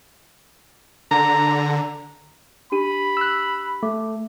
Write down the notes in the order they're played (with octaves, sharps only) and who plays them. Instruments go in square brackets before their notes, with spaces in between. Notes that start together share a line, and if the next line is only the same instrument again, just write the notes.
[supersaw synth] D3 [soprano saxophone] A#5
[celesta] D4 G4 D#7 [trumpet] B5
[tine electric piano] E6 F#6
[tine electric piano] A3 [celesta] D6